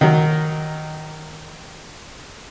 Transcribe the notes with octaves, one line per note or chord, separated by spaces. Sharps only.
D#3 F#3